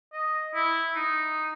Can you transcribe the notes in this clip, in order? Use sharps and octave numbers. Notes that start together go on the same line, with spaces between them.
D#5
E4
D#4